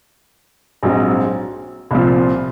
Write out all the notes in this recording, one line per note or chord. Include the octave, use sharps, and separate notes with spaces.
A#1 G#2 F#3 C4
C2 A#2 F3